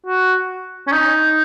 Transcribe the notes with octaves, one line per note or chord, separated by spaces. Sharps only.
F#4
C#4
D#4